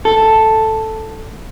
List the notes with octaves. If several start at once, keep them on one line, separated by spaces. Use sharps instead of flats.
A4